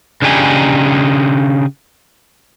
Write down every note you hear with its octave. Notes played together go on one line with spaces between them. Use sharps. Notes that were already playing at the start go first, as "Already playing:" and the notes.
C#3 D4 D#4 G4 G#5